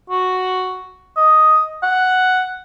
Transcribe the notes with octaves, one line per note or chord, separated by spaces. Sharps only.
F#4
D#5
F#5